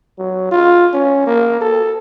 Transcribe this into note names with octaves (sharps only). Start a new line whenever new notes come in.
F#3
F4
C#4
A#3
A4